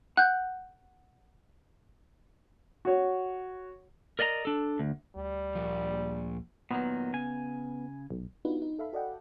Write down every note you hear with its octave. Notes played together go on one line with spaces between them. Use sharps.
F#5 F#6 G6
F#4 C#5
A#4 D5 D#5 F#5 A#5
D4 A4
D2
D2 G3
A#2 F3
A#2 D#3 F#3 B3
C#3 G#5
B1
B3 D4 D#4 F4 F#4 B4
D#4
A4 E5 F5 B5
F#4 A4 D5 D#5 F#5 G5